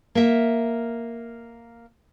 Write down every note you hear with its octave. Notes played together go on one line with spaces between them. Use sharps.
A#3 E5